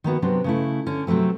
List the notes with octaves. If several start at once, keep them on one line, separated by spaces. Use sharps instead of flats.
D#3 A#3 B3 F#4
C3 F#3 B3 C4 D4
C#3 A3 E4
D3 C#4
C3 F#3 G3 A3 C4